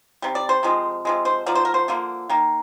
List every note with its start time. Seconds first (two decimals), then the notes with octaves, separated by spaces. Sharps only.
0.22 C3 G3
0.35 D5
0.49 C5
0.63 C3 F3 G#3
1.05 C3 F3 G#3
1.25 C5
1.46 D3 F3 A#3 D5
1.55 C5
1.65 A#4
1.74 C5
1.88 D3 F3 A#3
2.29 D#3 A#3